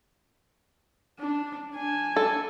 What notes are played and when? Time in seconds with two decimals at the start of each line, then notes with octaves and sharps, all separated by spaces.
1.19 D4
1.74 D4 G#5
2.16 A4